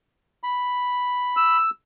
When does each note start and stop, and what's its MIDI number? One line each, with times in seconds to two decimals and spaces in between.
0.43 1.57 83
1.37 1.70 88